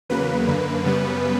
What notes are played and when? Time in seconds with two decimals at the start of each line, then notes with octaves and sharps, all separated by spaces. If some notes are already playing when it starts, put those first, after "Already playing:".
0.09 E2 C#3 F#3 A#3 B4
0.47 F#2 D3 A#3
0.84 F#2 C#3 G3 B3